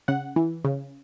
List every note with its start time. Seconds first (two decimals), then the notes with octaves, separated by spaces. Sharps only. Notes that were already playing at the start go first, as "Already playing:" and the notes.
0.08 C#3 F#5
0.36 E3
0.65 C#3